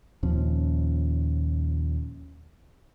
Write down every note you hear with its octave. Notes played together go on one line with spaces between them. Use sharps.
D#2 A#2 F3 C#4